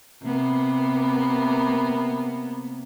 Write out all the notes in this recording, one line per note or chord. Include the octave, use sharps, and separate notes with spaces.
C3 A#3 B3